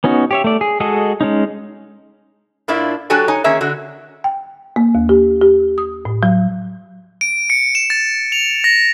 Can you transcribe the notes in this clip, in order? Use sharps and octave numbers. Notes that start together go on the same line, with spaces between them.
B3 C#4 D#4 F#4
G4 C#5 E5
A3 D5
G#4
G#3 F#4 G#4 A4 D#5
G#3 C#4 D#4
A2 A#3 D4 E4 F4
F#3 D4 F#4 G4 A4 G#5
D#4 C#5 G#5
D#3 A#3 C#4 G#4 E5
D3 F#4
G5
A#3
D#2
G4
G4
D#6
A2
F#3
D7
C#7
E7
A6
F7
A#6